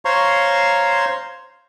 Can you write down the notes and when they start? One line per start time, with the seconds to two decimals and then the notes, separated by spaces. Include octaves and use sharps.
0.05 C5 C#5 F5 A#5 C6 C#6